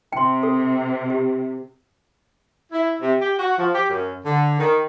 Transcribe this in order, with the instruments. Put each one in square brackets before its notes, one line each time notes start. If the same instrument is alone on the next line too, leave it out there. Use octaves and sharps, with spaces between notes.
[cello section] C3 [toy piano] G5 C6
[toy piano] A4
G4
[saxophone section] E4
C3
G4
F#4
F3
G4
F#2
D3
D#3